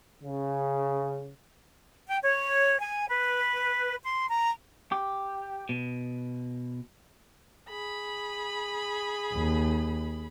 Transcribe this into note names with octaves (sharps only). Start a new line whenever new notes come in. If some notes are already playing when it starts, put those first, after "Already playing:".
C#3
G5
C#5
G#5
B4
C6
A#5
G4
B2
G#4 B5
D#2